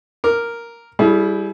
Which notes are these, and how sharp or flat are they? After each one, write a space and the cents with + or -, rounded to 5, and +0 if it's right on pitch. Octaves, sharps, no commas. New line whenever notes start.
A#4 +0 D6 +0
G3 +0 E4 +0 G#4 +40